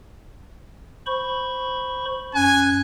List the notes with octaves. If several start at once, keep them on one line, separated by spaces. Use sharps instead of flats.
C5 B5 C#6
F#2 C#4 G#5 F#6